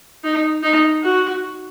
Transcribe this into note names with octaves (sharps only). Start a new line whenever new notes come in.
D#4
D#4
F#4